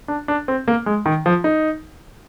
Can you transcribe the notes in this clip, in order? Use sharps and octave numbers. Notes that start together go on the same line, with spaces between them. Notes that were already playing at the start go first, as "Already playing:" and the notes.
D4
D4
C4
A#3
G#3
D#3
F3
D#4